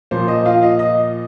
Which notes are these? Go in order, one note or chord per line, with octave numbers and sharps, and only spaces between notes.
A#2 F3 A#3 C5
D#5
F4 F5
D#5
D#5